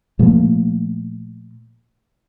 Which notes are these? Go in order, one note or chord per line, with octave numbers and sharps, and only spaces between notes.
A#2 F3 A3 A#3